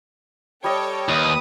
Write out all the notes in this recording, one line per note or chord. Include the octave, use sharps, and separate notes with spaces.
G3 A4 C#5 D#5 G5
D#2 B4 D#5 D#6